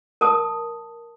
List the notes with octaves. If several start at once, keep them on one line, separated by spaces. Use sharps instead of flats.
A#4 A5 D#6